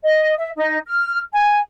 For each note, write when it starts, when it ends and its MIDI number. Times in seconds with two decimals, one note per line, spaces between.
0.02 0.32 75
0.37 0.49 76
0.55 0.77 63
0.86 1.17 89
1.32 1.58 80